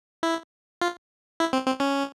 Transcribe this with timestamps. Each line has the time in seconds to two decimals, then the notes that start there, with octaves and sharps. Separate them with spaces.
0.23 E4
0.81 F4
1.40 E4
1.53 C4
1.66 C4
1.80 C#4